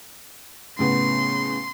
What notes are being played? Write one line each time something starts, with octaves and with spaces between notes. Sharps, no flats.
A2 C#3 B3 C6